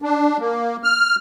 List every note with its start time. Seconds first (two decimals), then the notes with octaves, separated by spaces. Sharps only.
0.02 D4
0.40 A#3
0.84 F6